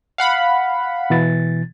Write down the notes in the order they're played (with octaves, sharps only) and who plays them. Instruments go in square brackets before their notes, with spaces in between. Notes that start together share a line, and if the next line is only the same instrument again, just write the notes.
[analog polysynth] F5 F#5 B5
[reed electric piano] B2 E3 A6